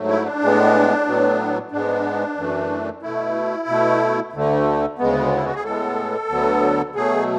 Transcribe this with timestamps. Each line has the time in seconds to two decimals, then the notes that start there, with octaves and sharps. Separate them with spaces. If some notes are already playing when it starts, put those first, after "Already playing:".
Already playing: G#2 F#3 A3
0.08 E4
0.25 D4
0.41 A2 G#3 B3
1.07 A2 F#3 B3
1.71 G#2 G#3 B3 D4
2.37 F#2 E3 A3
3.02 B2 A3 E4
3.68 B2 A3
4.33 D2 D3 A3
4.99 D2 C#3 G#3 B3
5.37 E4
5.45 F#4
5.54 G#4
5.64 A2 G#3 B3 A4
6.29 D2 D3 F#3 B3
6.95 B2 F#3 A3 G#4